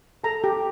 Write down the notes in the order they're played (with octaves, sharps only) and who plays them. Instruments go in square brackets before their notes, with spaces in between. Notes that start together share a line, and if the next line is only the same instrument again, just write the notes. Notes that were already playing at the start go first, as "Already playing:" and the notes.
[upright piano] A4 [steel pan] A#5
[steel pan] G4